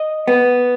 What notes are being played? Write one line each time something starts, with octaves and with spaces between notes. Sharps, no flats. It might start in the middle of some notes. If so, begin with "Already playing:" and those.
Already playing: D#5
B3